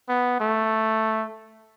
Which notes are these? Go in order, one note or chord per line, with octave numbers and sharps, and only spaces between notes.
B3
A3